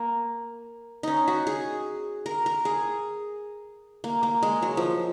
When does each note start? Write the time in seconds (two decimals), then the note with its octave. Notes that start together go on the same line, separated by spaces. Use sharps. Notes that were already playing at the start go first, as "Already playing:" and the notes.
Already playing: A#3
1.03 C#4 D#4
1.28 F#4
1.47 G#4
2.26 A#4
2.46 A#4
2.65 G#4
4.04 A#3
4.23 A#3
4.43 G#3
4.62 F#3
4.77 F3